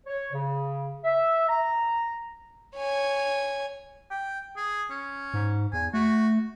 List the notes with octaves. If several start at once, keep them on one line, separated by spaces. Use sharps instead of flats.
C#5
C#3
E5
A#5
C#5 G#5
G5
G#4
C#4
G#2
E2 G#5
A3 F#4